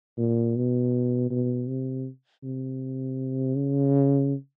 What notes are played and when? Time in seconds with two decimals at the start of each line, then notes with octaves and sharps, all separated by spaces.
0.18 A#2
0.56 B2
1.30 B2
1.68 C3
2.43 C3
3.56 C#3